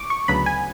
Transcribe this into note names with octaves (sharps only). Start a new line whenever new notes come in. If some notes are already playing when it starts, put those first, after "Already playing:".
Already playing: C#6 D6
C#6
D2 C#3 F#3 B3 D4 B5
G#5